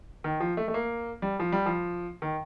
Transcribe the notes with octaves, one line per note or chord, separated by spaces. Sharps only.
D#3
F3
A3
A3
A#3
G3
F3
G3
F3
D#3